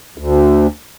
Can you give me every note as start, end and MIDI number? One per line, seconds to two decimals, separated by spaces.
0.18 0.67 38